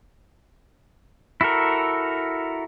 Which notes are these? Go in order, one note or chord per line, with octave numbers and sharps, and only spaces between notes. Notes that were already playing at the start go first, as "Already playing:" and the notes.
E4 F#4 A4 A#4